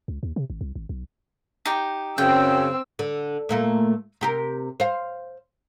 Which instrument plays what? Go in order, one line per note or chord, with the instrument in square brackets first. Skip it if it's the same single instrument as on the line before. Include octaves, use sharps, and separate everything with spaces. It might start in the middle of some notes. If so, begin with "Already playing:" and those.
[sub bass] C#2
D#2
C3
G#1
C2
G#1
B1
[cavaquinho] D#4 G4
[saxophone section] F#2 C#3 [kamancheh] C4 E6 [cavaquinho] G5
[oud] D3
A#2 A3 A#3
C3 G4 A#4
C5 F5